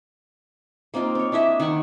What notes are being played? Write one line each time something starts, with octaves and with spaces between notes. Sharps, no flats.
A#3 C4 D#4 F4
C4 C#5
D4 E4 D#5 E5
D#3 G#4 F#5 C#6